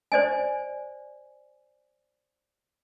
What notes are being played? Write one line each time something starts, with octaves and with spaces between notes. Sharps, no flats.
C5 D5 D#5 G#5